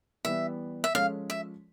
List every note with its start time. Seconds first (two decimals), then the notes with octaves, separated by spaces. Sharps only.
0.25 E3 G3 B3 E5
0.84 E5
0.95 F3 G#3 C#4 F4 A4 F5
1.30 E5